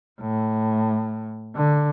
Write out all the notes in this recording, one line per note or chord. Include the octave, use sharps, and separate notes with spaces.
A2
D3